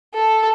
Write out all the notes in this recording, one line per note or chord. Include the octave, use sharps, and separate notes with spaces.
A4